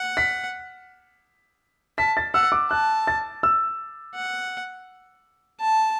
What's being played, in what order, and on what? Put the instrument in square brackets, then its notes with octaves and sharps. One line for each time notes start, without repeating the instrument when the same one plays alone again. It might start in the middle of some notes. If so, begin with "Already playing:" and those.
Already playing: [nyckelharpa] F#5
[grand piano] B6
[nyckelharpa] A5 [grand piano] B6
[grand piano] A6
[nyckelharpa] F#5 [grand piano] E6
[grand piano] D6
[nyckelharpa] A5 [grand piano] F#6
[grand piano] A6
E6
[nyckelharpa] F#5
A5